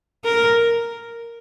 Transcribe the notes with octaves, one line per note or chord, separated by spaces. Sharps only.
A#4